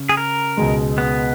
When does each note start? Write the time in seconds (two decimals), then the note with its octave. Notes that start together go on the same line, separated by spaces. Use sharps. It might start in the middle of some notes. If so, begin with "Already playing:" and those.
Already playing: C#3
0.09 G#4
0.17 A#4
0.57 C#2 B2 G#3
0.98 B3